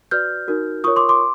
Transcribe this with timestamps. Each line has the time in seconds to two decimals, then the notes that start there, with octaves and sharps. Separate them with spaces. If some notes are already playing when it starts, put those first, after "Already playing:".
0.11 F#4 B4 D5 F6 G6
0.48 D#4 F#4 A#4
0.84 F4 A#4 C#5 C#6 D#6
0.96 C6 D6
1.09 C6 D6